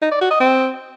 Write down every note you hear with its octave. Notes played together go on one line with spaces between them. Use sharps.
D#4
D5
F#4
D#5
C4